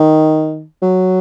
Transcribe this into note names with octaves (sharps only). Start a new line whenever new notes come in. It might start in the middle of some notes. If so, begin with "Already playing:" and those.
Already playing: D#3
F#3